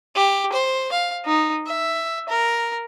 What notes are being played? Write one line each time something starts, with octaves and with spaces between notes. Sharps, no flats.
G4
C5
F5
D#4
E5
A#4